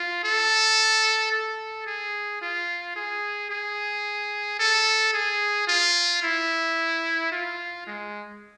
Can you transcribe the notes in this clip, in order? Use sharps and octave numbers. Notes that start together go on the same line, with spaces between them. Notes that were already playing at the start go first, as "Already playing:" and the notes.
Already playing: F4
A4
A4
G#4
F4
G#4
G#4
A4
G#4
F4
E4
F4
G#3